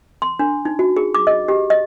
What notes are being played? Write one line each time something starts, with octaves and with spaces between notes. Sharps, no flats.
C6
D4
D#4
F#4
G#4
D6
D#5
G4
D#5